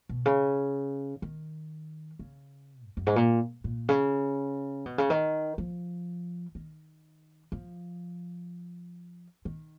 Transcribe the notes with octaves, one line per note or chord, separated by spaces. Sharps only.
B2
C#3
D#3
C#3
F2
F#2
G#2
A#2
A#2
C#3
B2
C#3
D#3
F3
D#3
F3
D#3